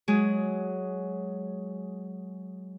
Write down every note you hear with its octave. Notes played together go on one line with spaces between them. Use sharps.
F#3 G#3 G#4